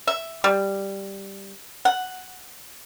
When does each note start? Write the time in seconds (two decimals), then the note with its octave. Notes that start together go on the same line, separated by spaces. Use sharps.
0.07 E5
0.44 G3
1.85 F#5